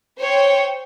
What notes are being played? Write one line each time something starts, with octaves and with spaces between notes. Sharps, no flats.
C5 C#5 G5